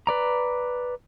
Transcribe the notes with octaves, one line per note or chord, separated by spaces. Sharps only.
B4 D5 A#5